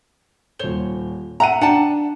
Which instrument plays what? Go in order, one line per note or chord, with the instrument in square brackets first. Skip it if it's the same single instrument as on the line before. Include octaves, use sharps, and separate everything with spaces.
[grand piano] D#1 G7 [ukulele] C5 C#5
[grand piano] E5 F#5 D#7 [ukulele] A#5
[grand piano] D4 [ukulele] F#5 G5 A5